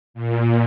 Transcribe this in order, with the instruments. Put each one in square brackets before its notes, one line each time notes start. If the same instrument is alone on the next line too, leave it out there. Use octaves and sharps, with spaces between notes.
[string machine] A#2